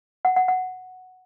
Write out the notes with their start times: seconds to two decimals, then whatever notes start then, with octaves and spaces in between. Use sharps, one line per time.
0.25 F#5
0.36 F#5
0.48 F#5